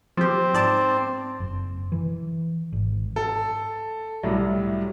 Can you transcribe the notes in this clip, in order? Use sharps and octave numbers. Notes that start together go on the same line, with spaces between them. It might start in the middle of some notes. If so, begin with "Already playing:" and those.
F3 C4 G4
G#2 D5 A5
F#1
E3
G#1
A4
C2 A2 F#3 G3